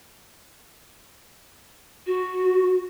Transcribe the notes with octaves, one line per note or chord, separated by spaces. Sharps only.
F#4